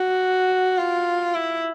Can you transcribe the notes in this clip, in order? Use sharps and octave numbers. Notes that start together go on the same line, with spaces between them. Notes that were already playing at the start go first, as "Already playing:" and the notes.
Already playing: F#4
F4
E4